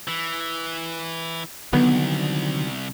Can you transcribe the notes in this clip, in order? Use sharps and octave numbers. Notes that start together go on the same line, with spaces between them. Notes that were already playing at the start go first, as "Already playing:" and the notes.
E3
C2 D3 D#3 F#3 B3